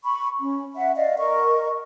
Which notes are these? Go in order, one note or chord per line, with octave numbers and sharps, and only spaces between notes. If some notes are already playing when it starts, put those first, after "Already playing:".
B5 C#6
C#4
E5 F#5
D5 D#5 F5
A#4 D#5 C#6